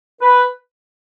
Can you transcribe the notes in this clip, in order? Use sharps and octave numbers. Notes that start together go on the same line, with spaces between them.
B4